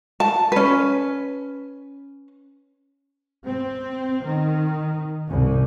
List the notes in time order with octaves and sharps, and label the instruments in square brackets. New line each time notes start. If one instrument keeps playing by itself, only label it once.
[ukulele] A5
C#4 B4
[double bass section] C4
D#3
C2